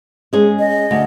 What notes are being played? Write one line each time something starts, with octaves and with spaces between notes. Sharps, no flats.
G#3 C#4 G#4
D#5
D2